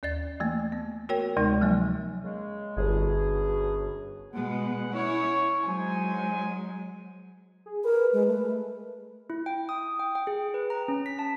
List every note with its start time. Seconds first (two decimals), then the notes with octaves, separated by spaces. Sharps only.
0.03 D#2 D5 A6
0.40 E3 A3 A#3
0.72 B3
1.09 F#4 A#4 C#5 G5
1.37 D2 C3 G#3 D#4 A#6
1.61 F3 F#3 A#3
2.23 C#3 G#3
2.77 G1 F#2 B2 G#4
4.33 B2 G#3 G#4 B4 F#5
4.93 C#4 E4 C#5
5.64 F#3 G#3 D#4 C5 G#5
7.66 G#4
7.84 A#4 B4
8.13 G#3
8.27 A3
9.30 E4
9.46 G5
9.69 D#6
9.99 G5
10.15 G5
10.27 G#4
10.54 B4
10.70 A#5
10.88 C#4
11.06 B6
11.19 A5